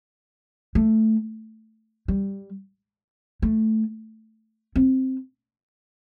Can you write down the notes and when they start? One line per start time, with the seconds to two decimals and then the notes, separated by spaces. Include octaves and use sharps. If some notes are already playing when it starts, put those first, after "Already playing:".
0.75 A3
2.08 G3
3.42 A3
4.76 C4